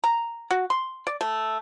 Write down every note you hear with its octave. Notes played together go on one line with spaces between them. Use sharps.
A#5
F#4
C6
D5
A3